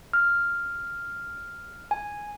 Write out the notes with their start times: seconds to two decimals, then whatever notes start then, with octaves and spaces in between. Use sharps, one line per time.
0.13 F6
1.91 G#5